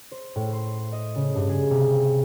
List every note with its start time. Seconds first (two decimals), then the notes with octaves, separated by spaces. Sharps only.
0.12 C5
0.36 A2
0.53 C6
0.92 D#5
1.15 C#3
1.35 G2
1.49 G#4
1.71 C3